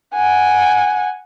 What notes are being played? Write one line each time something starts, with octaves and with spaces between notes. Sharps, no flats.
F#5 G#5